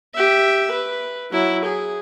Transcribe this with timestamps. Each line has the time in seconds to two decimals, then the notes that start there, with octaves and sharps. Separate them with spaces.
0.15 G4 E5
0.72 B4
1.32 F#3 E4
1.66 G#4